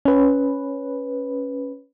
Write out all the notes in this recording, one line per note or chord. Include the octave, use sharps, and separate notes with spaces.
C#4 B4